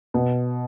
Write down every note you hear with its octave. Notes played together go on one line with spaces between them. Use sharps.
B2